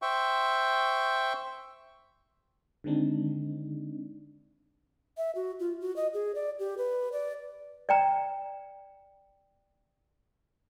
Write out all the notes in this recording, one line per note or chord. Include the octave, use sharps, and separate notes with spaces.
C5 E5 G5 C#6
D3 D#3 G#3 C4 D4 D#4
E5
F#4
F4
F#4
D#5
G#4
D5
G4
B4
D5
D5 G5 A#5